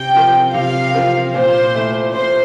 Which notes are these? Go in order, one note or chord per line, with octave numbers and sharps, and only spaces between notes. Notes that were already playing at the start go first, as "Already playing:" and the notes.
Already playing: C3 G5
F3 C4 F4 A#4
C3 F5
F3 C4 F4 A#4
A#2 C5
A3 E4
A#2 C5